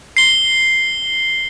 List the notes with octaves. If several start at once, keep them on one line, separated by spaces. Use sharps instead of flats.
C7 G7